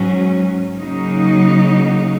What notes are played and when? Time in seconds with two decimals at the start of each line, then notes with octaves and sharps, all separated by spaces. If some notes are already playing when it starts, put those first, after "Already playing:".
Already playing: G#2 F#3 C#4
0.77 C#3 F#3 A#3 D#4